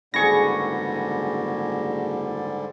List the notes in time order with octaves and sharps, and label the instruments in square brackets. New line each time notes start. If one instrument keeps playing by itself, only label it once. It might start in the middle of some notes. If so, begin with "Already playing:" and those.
[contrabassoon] F#1 [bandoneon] G#2 D3 G3 [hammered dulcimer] E3 G#4 [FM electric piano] C#6 A#6